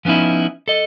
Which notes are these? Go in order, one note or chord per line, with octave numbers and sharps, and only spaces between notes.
F3 B3 C#4 D#4 E4
A4 D#5